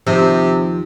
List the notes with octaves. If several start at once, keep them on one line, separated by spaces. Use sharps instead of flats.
D#2 C3 F3 C5